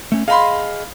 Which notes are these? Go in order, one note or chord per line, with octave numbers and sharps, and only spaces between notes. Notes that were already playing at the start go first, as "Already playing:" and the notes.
A3 C#4
G#4 D#5 F5 B5 C6